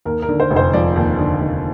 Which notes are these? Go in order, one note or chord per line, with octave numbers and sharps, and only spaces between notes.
D#2 A#4
A#4
D3
C5
F1
C5
F3 D5
D#2
D3
F1